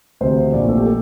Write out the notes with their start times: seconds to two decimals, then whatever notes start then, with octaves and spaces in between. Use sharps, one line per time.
0.21 D2 C3 E3 C5
0.53 A#1 A#2 A3 D5
0.69 A4
0.78 G4
0.86 A4